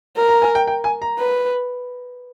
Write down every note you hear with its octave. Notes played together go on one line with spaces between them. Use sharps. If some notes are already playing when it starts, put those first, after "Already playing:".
A#4
A#5
G#5
G5
G5
G#5
A#5
B4